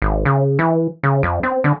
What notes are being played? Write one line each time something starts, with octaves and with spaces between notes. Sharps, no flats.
G#1
C#3
E3
C#3
F2
C4
D3